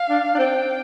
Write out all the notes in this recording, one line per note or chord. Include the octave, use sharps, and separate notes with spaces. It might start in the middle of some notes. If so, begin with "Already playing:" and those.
Already playing: F5
D4
D4
C4 G5